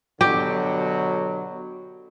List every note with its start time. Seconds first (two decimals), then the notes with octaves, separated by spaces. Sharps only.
0.21 B2 D3 F#3 G4